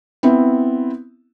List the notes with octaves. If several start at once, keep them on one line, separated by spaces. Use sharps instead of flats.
B3 C4 E4